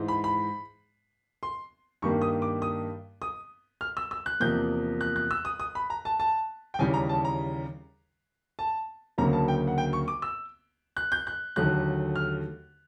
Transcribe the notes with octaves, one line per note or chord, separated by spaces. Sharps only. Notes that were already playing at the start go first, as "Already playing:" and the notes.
Already playing: G#2 E3 G#3
B5
B5
C6
G2 D#3 G3 A#3 C#6
D#6
D6
D#6
D#6
F6
E6
E6
F#6
E2 C3 F3 A#3 G6
F#6
F#6
E6
D#6
D#6
B5
A#5
A5
A5
G5
D#2 C#3 E3 G3 G#5
A#5
A5
A#5
A5
D2 C#3 F#3 A#3 A#5
A5
G5
F#5
G5
C#6
D6
E6
F#6
G6
F#6
D#2 D3 F#3 A3 F#6
F6